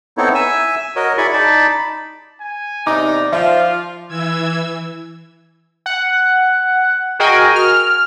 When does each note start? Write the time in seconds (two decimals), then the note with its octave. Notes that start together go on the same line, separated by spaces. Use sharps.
0.17 B3 C4 D#4 E4 A4 C#5
0.35 E5 G#5 E6
0.96 F#4 A#4 C#5 D#5
1.18 E4 G#4 D5 B5 C#6
1.33 D#4 D5 A5 B5
2.41 G#5
2.87 E2 C3 D#4 D5 D6
3.33 F3 F4 E5
4.08 E3 E6 G#6
5.86 F#5
7.19 F#4 G#4 A#4 D#5 G5 G#5
7.56 F6